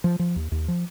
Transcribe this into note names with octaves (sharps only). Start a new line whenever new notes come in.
F3
F3
D#2
D#2
F3